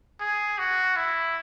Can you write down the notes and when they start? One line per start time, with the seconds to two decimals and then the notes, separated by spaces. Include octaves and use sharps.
0.21 G#4
0.58 F#4
0.96 E4